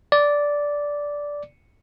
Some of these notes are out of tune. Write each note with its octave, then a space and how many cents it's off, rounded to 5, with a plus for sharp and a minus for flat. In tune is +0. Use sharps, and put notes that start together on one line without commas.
D5 -10